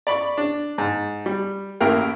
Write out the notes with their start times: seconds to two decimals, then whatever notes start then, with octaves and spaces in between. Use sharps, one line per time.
0.07 D5 B5 C#6
0.38 D4
0.78 G#2
1.26 G3
1.80 A1 D#2 A#3 E4 A#4 G5